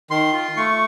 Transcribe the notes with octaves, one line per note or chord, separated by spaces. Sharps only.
D#3 C6
F4
A3 C#6